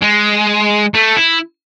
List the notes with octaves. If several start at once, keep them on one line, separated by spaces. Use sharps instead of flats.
G#3
A3
E4